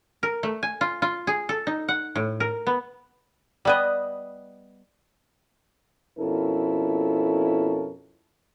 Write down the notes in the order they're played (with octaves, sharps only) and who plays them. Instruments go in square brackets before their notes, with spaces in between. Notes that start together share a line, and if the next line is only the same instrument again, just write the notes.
[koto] A#4
A3
G#5
F4
F4
G#4
A4
D#4
F#5
A2
A#4
B3
G3 B3 D#5
[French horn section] F2 B2 C#4 E4 A4 A#4